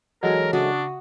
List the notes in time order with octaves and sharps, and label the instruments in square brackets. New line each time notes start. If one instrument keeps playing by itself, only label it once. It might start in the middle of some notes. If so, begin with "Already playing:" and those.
[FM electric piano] E3 F#4 [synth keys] F#3 G#3 A4 [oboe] A#4
[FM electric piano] C#3 E5 D#6 [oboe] D4 [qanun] F#4